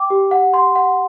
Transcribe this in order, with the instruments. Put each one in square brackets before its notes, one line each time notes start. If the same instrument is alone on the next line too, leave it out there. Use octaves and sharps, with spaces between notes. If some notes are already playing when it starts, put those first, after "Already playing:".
Already playing: [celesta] G5 D6
G4
F#5
C6
F#5